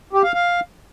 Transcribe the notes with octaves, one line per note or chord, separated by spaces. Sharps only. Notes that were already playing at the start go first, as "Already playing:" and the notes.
G4
F5
F5